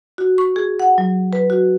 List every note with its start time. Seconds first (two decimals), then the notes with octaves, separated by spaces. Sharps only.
0.18 F#4
0.38 C#6
0.56 G#4
0.80 F#5
0.98 F#3
1.33 B4
1.50 F#4